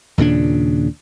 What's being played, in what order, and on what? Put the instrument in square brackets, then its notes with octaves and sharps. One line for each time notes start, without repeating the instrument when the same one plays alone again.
[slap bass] D#2 A#2 C#3 D4